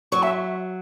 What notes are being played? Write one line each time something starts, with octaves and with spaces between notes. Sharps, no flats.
F#3 C#6
E5